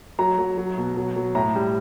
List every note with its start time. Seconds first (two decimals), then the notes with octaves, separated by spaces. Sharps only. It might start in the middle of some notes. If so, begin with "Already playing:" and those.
0.19 F#3 A#5
0.39 F#3
0.58 F#3
0.78 B2
0.97 F#3
1.16 F#3
1.35 A2 A#5
1.55 G3